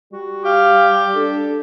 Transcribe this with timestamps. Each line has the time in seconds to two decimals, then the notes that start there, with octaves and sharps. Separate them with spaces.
0.13 G3 F#4
0.45 G4 F5
1.15 D4 A4